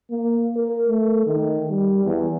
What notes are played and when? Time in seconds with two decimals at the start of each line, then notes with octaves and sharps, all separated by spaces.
0.10 A#3
0.56 A#4
0.89 A3
1.27 D#3
1.69 G3
2.05 E2